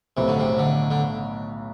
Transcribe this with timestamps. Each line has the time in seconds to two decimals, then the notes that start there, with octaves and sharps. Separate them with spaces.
0.17 B1 A2 C3 F#3 B3
0.28 D3
0.40 C3
0.59 D3
0.91 D3